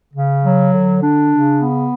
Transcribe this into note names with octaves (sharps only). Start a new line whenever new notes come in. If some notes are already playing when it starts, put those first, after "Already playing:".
C#3
F#3
D3
D4
C#3
B3